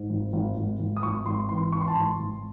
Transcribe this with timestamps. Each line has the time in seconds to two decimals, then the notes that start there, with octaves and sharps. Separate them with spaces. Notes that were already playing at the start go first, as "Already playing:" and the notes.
Already playing: G#2
0.09 G#1
0.33 G#1
0.57 G#1
0.79 G#1
0.97 D#6
1.03 G#1 C#6
1.26 G#1 C6
1.49 E3 C6
1.72 E3 C#6
1.81 C6
1.88 A5
1.96 G#1 C6
2.19 G#1